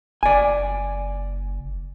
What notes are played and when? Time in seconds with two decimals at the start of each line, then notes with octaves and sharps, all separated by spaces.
0.23 F#1 D5 G#5